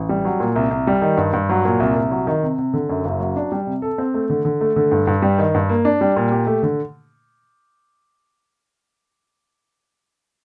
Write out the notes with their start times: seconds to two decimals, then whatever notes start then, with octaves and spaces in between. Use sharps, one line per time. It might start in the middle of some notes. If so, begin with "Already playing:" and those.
Already playing: A1
0.09 G3
0.25 F#3
0.40 A#2
0.56 C2
0.71 C2
0.87 G3
1.02 D#3
1.17 G2
1.33 G2
1.49 F#3
1.65 A#2
1.80 C2
1.96 C2
2.11 F#3
2.27 D#3
2.43 C3
2.58 C3
2.74 D3
2.89 F#2
3.05 F#1
3.20 F#3
3.36 D4
3.52 G3
3.67 C3
3.82 A4
3.98 C4
4.14 A3
4.30 D3
4.45 D3
4.61 A3
4.76 D3
4.91 G2
5.07 G2
5.22 G3
5.39 D#3
5.54 G2
5.69 A#3
5.85 D4
6.01 G3
6.16 A#2
6.32 G4
6.47 A3
6.63 D3